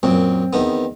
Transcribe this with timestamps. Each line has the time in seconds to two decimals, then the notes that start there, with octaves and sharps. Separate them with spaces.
0.03 F#2 A#2 C4
0.53 E2 D#3 B3